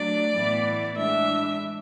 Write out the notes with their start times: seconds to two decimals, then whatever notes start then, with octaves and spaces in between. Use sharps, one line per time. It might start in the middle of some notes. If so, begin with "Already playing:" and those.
Already playing: F#3 A3 D4 D5
0.35 A2 E3 B3 E4
0.97 E3 G#3 D4 E5